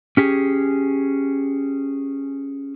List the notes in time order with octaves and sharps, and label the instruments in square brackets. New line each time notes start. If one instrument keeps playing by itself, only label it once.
[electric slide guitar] C#4 G4 G#4